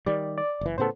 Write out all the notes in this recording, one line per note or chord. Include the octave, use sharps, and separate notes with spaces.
D#3 G3 D5
D5
F#1 E3
A2 C#3 B3 A4 C5